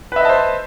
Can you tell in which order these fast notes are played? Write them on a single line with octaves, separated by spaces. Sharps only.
B4 E5 D#5 A5 C5